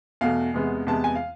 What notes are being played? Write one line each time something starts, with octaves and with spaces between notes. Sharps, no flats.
E2 B2 A3 F5
E2 C3 G#3 B3
E2 C3 G#3 B3 A5
G#5
F5